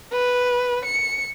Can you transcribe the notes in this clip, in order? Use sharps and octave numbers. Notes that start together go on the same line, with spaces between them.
B4
C#7